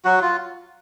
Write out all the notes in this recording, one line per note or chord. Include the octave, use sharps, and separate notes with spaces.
F#3 F#4
F4